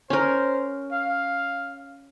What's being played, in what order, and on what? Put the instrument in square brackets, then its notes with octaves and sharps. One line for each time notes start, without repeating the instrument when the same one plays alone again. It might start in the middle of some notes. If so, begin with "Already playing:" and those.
[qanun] C#4 A#4 [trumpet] C5
[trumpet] F5